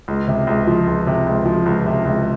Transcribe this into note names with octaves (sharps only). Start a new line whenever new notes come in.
C#2
C3
C#2
F3
C#2
C3
C#2
F3
C#2
C3
C#2